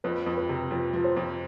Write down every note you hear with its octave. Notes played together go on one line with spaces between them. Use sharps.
F2 B4
F2
B4
C3
F2 B4
F3
C5
F2